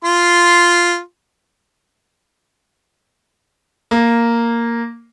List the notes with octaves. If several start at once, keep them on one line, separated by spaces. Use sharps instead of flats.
F4 C6
A#3